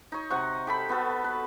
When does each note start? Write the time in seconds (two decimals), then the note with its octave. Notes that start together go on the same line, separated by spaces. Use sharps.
0.12 D#4 C#5
0.30 C3 F#5 C#6
0.67 G4 A4 B5
0.89 B3 F#4 A4
1.24 B4